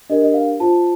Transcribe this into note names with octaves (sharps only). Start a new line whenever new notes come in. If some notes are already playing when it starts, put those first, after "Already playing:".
D4 G4 A#4 D5 D#5
D#5
F5
F4 C5 A5